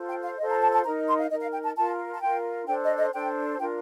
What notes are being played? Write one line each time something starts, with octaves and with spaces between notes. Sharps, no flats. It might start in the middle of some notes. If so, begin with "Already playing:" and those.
Already playing: F4 A4 C5
G5
F5
F4 A4 C5 D#5
A#5
A5
A5
D#4 A#4 A#5
C6
F5
D#4 A#4 D#5
F5
G5
A5
F4 A#4 A5
A5
F4 A#4 G5
D4 A4 C5 G5
D#5
D#5
D4 A4 C5 G5
D4 F4 A#4 G5